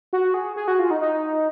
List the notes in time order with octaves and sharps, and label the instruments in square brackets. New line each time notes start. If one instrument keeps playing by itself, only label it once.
[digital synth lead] F#4
G#4
G#4
F#4
F4
D#4
D#4